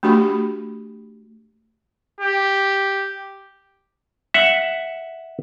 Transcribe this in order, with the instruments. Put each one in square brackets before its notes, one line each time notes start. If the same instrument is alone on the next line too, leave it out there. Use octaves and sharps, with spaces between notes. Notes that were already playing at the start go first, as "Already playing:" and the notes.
[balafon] A3 D4 F#4 G4 B5
[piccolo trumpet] G4
[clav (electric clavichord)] E5 F#5